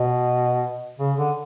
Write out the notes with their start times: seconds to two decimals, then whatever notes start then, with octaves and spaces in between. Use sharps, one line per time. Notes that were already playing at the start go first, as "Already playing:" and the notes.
Already playing: B2
0.99 C#3
1.18 D3